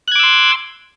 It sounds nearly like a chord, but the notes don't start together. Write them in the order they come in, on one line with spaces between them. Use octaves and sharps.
F#6 G#6 D6 E6 C6